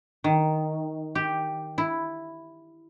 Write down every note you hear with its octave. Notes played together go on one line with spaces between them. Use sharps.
D#3
G4
E4